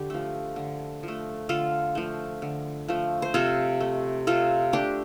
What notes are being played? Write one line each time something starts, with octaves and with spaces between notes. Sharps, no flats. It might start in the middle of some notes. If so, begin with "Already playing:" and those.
Already playing: D3 G4
F3 A3
D3
F3
A3
D3 F4 A4
F3 A3
D3
F3 A3
C5
C3 F4 A4
A3
C3 F4 A4
A3 D4 G4